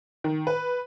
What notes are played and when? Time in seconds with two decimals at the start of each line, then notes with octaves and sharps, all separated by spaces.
0.24 D#3
0.47 B4